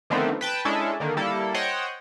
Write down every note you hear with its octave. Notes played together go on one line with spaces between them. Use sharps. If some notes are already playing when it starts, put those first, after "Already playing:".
D3 D#3 F3 A3 B3 C4
B4 G5 A5
G#3 C#4 D4 E4 G#4 A4
D3 D#3 A#3
G3 A#3 E4 A4
C5 C#5 D#5 F#5 G5